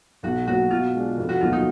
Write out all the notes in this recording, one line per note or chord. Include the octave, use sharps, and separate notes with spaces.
B1 F#4
A#2 F#3 F#4
B2 F4
G#3 D4
F1
F#4
D#2 D#3 F#3 B3 F4
D#4